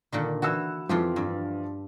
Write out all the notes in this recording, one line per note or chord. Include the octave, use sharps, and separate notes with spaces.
A#2 D3 D#3
E3 E4 F#4 F#5 E6
F2 E3 F3 F4 G4
G2